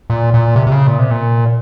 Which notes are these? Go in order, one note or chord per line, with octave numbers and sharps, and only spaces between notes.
A#2
A#2
C3
C3
C#3
A#2
C3
A#2